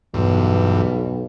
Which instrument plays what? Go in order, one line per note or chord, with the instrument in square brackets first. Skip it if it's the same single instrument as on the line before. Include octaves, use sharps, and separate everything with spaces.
[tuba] B1 [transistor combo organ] E2 G2